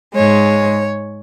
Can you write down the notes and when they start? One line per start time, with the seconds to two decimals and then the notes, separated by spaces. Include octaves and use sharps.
0.15 G#2 G#3 C#5